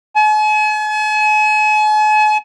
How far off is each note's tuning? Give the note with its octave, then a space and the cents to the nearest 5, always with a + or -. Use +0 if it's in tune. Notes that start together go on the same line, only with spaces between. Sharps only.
G#5 +45